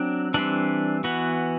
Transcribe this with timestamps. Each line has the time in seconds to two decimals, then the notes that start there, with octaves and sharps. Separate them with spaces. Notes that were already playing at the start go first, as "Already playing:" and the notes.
Already playing: F#3 C4 D4
0.34 E3 G3 C4 D4
1.04 E3 B3 F#4